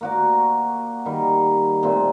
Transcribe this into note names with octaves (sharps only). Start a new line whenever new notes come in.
A#3 F#4 D5
D#3 G3
A#2 A3 C4